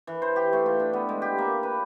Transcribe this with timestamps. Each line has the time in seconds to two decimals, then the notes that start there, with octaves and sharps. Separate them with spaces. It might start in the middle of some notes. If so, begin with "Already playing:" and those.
0.07 E3
0.22 C5
0.36 G4
0.53 A3
0.66 F4
0.80 D4
0.93 B3
1.09 G#3
1.22 G4
1.38 A#3
1.63 B4